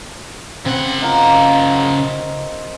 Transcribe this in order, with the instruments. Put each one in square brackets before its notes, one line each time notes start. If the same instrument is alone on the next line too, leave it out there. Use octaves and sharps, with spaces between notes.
[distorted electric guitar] C#3 F#5 [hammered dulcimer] C4 B5
[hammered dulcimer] D#4 F4 A#4